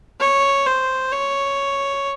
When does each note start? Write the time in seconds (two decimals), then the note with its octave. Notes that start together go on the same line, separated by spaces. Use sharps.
0.20 C#5
0.66 C5
1.12 C#5